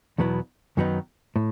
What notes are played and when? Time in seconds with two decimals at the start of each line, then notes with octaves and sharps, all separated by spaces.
0.18 E2 B2 F#3 B3 E4
0.77 F#2 D#3 F#3 B3 D#4
1.36 A2